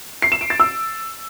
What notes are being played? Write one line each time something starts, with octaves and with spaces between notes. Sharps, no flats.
C7
E7
D7
A6
E6